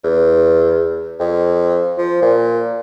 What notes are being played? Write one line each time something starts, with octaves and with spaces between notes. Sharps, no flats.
E2
F2
F3
A#2